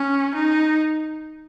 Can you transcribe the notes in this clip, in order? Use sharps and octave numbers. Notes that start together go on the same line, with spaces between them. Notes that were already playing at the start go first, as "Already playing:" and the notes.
Already playing: C#4
D#4